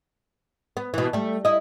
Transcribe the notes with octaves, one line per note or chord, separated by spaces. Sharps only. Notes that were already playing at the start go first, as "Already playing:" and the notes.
B3
B2 E3
G3 A3
E4 D#5